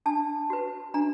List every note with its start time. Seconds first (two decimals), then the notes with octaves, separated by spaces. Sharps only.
0.06 D4 A5
0.50 F#4 B4
0.94 D4 A#5